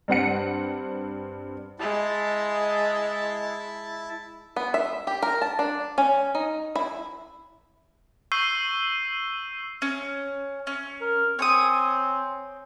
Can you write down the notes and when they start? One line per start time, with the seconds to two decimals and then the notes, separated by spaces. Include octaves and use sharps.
0.08 G2 C4 F#5 C#7
1.80 G#3 E4 A5
4.56 B3
4.74 E5
5.07 G4
5.23 A#4
5.42 A5
5.59 D4
5.98 C#4
6.35 D#4
6.76 E4
8.32 C#6 E6 G6 C7 D#7 G7
9.82 C#4
10.67 C#4
11.01 A#4
11.39 C4 C#5 G#5 D#6